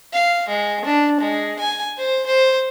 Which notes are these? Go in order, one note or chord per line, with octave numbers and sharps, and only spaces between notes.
F5
G#3
D4
G#3
G#5
C5
C5